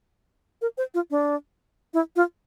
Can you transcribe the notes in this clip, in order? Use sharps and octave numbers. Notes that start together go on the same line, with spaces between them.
A#4
C5
F4
D4
E4
F4